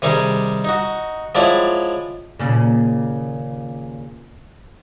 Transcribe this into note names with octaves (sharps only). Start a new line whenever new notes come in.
C3 D#3 G3 D#4 G#4
D#4 F#4
F3 F#3 G#3 E4 D5
D#2 A#2 C#3